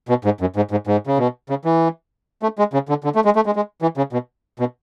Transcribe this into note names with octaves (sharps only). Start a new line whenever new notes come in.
B2
G#2
F#2
G#2
G#2
G#2
C#3
B2
C#3
E3
A3
G#3
C#3
D3
D3
A3
G#3
A3
G#3
G#3
E3
C#3
B2
B2